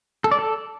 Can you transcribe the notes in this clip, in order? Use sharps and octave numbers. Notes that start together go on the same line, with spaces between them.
A4
D5
A4